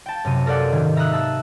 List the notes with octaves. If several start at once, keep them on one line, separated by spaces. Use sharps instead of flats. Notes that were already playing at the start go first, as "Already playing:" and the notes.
G5 A5
F#2 C3 D#7
A4 A#4 C5 D5 F#5
G#2 D#3 G4 G#6
E5 A#5 D#6 E6 F#6
A5 E6 F#6